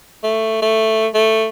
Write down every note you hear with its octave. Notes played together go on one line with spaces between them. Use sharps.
A3
A3
A3